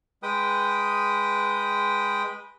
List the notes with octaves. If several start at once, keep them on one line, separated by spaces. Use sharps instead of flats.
G#3 B4 G5 D#6